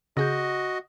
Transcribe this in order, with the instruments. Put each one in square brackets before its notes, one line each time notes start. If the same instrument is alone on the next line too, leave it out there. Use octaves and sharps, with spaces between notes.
[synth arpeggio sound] C#3 G#4 G6 [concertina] F#4 D#5